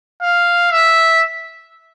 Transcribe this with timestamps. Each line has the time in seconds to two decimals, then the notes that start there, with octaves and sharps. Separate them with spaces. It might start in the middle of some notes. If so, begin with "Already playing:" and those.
0.23 F5
0.71 E5